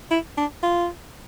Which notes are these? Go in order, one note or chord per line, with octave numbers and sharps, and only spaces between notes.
E4
D4
F4